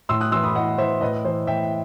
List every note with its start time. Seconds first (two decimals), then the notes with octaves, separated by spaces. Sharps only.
0.09 A2 C6 E6
0.21 D#6 F#6
0.32 E3 C6 E6
0.43 B5 D#6
0.55 A2 D#5 F#5
0.78 E3 C5 E5
1.01 A2 B4 D#5
1.25 E3 C5
1.47 A2 E5 G5